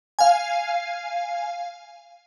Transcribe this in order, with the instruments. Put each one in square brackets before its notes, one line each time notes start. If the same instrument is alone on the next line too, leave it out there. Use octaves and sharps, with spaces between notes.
[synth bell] F5 G#5